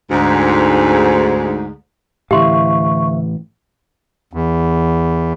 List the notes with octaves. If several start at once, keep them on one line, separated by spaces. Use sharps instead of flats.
D2 G#2
D2 A2 E3 G4 E5 F5 C6 C#6
E2